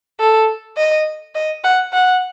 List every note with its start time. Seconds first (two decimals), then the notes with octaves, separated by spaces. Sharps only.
0.20 A4
0.77 D#5
1.35 D#5
1.64 F#5
1.93 F#5